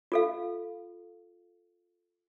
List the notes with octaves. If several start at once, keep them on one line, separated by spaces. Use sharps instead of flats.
F4 A4 F5